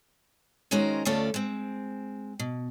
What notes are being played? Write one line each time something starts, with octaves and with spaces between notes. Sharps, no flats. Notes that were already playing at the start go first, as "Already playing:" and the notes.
D#3 G#3 C#4 F#4 A#4 C5
D2 A3 C#4 F4 A4 D5
G#3 C4
B2